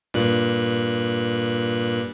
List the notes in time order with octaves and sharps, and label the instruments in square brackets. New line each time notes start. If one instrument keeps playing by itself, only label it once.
[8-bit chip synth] G2 A#2 F#6